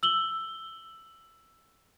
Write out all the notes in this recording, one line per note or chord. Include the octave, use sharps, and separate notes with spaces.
E6 F#7 G7